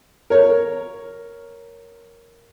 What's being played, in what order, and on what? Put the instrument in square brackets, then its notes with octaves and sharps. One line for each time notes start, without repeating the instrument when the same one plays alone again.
[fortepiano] A#4 C#5